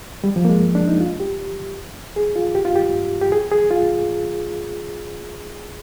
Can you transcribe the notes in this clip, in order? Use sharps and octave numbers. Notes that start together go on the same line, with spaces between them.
G3
F3
A#3
G#3
D4
D#4
F4
G4
G#4
F4
G4
F4
G4
G4
G#4
G#4
F4